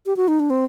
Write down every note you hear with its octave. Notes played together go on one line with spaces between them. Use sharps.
G4
F#4
D#4
D4
C4